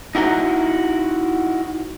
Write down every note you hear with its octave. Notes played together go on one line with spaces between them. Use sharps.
D#4 E4 F#4 A4 A#5